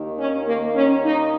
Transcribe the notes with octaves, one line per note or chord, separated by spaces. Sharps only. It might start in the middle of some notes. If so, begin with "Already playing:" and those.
Already playing: D#2 D#3
C#4
A#3
C#4
D#4